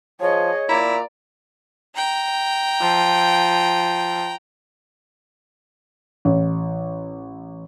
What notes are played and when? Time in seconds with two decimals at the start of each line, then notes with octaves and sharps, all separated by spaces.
0.21 F3 G#4 C#5 D#5
0.69 A#2 E4 D5 A#5
1.96 G5 A#5
2.81 F3
6.25 A1